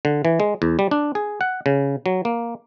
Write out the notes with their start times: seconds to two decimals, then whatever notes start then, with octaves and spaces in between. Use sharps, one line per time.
0.05 D3
0.25 E3
0.40 G#3
0.62 E2
0.79 G3
0.91 D4
1.15 G#4
1.41 F#5
1.66 C#3
2.06 F#3
2.25 A#3